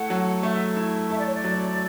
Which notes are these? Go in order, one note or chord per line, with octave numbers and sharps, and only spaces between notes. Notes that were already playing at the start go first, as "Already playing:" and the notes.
Already playing: A3 E4 A4 F#5
F#3
A3 E5
E4
A4 E5
D5
C#5
D5
F#3